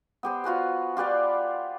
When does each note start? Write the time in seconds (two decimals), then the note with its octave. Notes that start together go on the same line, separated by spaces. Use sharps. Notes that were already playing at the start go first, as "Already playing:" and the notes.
0.23 B3 G4 C5
0.44 F4 F#4 B4 G#5
0.97 F4 G4 B4 D5